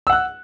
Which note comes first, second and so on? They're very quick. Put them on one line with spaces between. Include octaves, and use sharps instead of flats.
E6 F#5 F#6